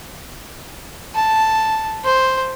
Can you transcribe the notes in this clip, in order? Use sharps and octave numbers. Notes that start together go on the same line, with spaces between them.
A5
C5